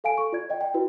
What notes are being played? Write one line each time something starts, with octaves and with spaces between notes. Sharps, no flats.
A4 F5 G#5 D7
A4 C#6
F4 D5 G#6
D5 D#5 G5
G5
E4 F#4 B4